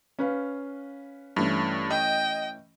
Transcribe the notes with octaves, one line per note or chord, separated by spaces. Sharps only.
C#4 B4 F5
G2 E3 A3 C#4
D#5 G5